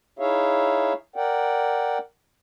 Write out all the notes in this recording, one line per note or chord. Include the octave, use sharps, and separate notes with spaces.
D#4 E4 G#4 C#5 E5 F5
A#4 D5 F#5 G5